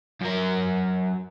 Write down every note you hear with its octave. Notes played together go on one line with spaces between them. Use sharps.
F#2 A#4